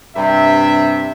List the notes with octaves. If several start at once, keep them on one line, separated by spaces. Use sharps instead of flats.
G2 C3 E5